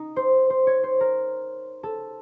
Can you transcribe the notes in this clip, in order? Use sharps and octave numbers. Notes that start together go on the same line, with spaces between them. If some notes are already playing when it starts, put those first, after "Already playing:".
Already playing: D#4
C5
C5
C#5
C5
A#4
A4